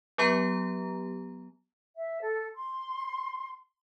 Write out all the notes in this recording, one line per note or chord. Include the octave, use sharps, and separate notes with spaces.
F#3 B3 G4 A#5
E5
A4
C6